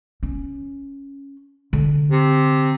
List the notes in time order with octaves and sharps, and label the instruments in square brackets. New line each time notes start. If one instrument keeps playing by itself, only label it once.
[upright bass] C#4
D3
[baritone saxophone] C3